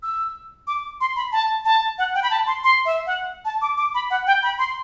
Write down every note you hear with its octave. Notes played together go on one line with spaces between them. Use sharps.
E6
D6
C6
B5
A5
A5
F#5
G5
B5
A5
C6
C6
E5
F#5
A5
D6
D6
B5
F#5
G5
B5
C6